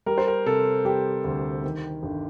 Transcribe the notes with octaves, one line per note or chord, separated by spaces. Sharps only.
G3 A#4
C5
A#4
C3 A4
G3 G4
D2
D#3
G1